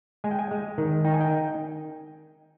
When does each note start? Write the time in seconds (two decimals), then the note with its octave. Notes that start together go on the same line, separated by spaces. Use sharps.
0.24 G#3 G#5
0.31 G5
0.39 G#5
0.51 G#3
0.78 D#3
1.05 D#4 G5
1.14 G#5
1.21 G5